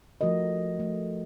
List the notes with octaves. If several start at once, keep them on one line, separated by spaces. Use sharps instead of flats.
F3 A3 F#4 A#4 D#5
A3